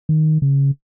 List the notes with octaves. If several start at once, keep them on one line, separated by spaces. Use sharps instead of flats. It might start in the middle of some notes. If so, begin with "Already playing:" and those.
D#3
C#3